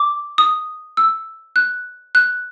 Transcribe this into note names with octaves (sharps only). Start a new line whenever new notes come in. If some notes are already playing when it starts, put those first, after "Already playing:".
Already playing: D6
D#6
E6
F#6
F#6